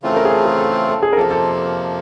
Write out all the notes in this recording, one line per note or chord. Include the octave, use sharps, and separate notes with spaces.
C#3 E3 A3 C4 F4
A4
A#4
G#4
A4
G#4
A4
A4
G#4
A#4
F2 C3 F3 A#3 A4
A4